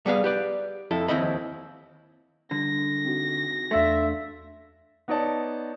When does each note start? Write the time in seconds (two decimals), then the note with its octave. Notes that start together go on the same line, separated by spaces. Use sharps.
0.06 G3 B3 G#4 F5
0.24 G4 B4 D5
0.91 F2 E4 A4
1.08 D#2 G#2 C4 E4 D#5 B5
2.51 D3 G3 A#6
3.05 C4 D#4 F#4
3.71 E2 A3 D4 E5 F5 C6
5.08 B3 D#4 C#5 D5 A5